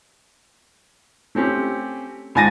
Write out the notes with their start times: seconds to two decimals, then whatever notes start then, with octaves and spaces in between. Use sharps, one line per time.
1.35 A3 C4 C#4 G4
2.35 C#2 G#2 G#5 A6 A#6 D#7